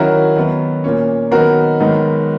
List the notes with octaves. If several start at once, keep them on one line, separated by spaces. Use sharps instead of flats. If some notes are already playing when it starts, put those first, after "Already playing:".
Already playing: D#3 F#3 C#4 E4 F#4 A#4
D#3 F#3 B3
A#2 A#3 C#4
D#3 F#3 B3 D#4 F#4 A#4
G#2 D#3 F#3 B3 D#4